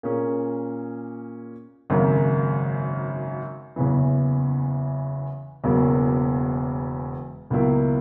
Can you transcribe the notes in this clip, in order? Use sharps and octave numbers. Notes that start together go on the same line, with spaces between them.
A#2 A#3 C#4 G#4
G#1 F#2 C#3 F#3 A#3
F#1 E2 C#3 E3
E1 E2 C#3 F#3 A#3
C#2 B2 F#3 A#3 E4